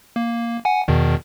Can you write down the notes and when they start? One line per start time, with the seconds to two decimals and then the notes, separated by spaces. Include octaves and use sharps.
0.16 A#3
0.65 F#5 G#5
0.88 E2 B2 D#3